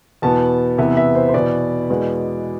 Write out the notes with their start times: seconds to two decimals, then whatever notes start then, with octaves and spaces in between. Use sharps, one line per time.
0.22 E2 B2 B3 A5
0.78 E2 C3 E3 B3 E5
0.97 E5
1.15 C5
1.29 C5
1.34 E2 B2 B3 D5
1.90 E2 B2 G#3 B3